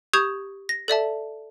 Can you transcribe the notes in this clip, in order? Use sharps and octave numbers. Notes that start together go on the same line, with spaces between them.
G4 C#6 D#6 G6 G#6 F7
A#6
A4 D5 E5 A5